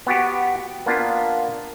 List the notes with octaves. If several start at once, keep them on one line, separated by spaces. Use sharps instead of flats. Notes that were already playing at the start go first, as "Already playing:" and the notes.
B3 F#4 G4
A#3 B3 D4 F4